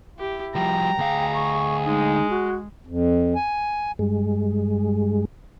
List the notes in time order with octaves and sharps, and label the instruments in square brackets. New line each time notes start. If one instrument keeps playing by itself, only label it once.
[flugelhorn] E4 [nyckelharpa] G4
[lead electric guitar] F3 G3 [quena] G5 [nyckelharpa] A#5
[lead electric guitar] D2 F5 [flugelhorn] G#4
[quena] C#6
[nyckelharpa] G#3 [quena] D#4
[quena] F#4
[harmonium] F2
G#5
[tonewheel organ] G2 G#3